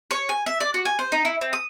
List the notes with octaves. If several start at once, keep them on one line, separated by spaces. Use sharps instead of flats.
C#5
G#5
E5
D5
F#4
G#5
C5
D#4
E4
C4
D#6